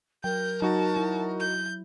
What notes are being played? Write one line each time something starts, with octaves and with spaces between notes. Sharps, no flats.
F#3 A#4 G5 G6
F#3 D#4 F#4 A5
E4
G6